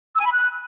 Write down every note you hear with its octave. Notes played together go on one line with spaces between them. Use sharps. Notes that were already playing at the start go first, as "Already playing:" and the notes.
E6
G#5
B5
F#6